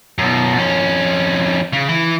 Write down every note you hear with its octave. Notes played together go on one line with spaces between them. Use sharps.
F#2 B2
F2 C#4
C#3
E3